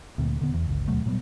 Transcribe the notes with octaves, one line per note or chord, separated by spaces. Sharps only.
D2 A#2 C4
D#1 D3 B3
E2
G1 C#2
D#2 B2 F#3 A3
A#2 F#3 G3 B3